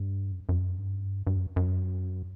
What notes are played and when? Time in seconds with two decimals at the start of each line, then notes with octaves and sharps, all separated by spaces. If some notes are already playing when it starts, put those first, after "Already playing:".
Already playing: G2
0.32 F#2
0.49 F#2
0.79 G2
1.27 G2
1.36 F#2
1.56 F#2